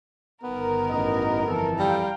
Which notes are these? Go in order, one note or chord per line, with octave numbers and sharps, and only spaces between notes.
G1 D#3 B3 A#4
A1 D#5
F2 E3 A4
G3 F5 G5 A#5